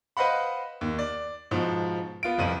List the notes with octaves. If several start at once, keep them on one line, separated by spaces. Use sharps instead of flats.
B4 C5 D#5 F5 F#5 B5
D#2
D5
G#2 B2 F3
B3 F4 D7
E1 C2 F2 D#7